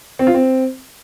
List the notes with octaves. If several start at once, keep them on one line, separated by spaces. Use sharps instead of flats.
C4
F4
C4